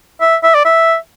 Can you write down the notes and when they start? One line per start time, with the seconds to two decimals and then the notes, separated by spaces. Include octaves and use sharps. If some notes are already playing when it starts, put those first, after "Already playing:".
0.21 E5
0.43 E5
0.55 D5
0.65 E5